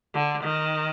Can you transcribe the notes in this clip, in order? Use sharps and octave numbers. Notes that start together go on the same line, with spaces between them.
D3
D#3